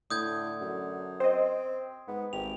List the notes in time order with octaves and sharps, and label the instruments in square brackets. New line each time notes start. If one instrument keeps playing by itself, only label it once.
[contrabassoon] A2 [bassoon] D3 [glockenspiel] D#6 G6 G#6
[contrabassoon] F#2
[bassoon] C4 [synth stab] C5 D#5
[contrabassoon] G#2 [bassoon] B3
[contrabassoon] G#1 [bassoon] G4 [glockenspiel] F7